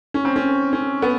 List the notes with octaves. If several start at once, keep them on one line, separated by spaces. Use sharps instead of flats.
C#4
C4
C#4
C#4
B3